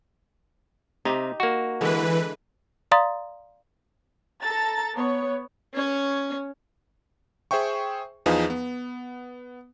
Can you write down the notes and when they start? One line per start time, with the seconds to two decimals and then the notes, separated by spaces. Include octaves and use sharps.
1.05 C3 D#4 G4
1.40 A#3 F#4
1.81 D3 E3 G#3 D4 B4
2.91 D5 F5 A#5 C6 D#6 A6
4.42 A4 A#5 A6
4.95 B3 C#5
5.74 C#4 C#5
7.51 G#4 C5 E5 G5 C#6
8.26 E2 F3 D#4 G#4 B4 F5
8.50 B3